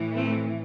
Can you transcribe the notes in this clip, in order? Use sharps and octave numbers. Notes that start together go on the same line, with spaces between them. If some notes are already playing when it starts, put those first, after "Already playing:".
Already playing: A2 E3
A3 C4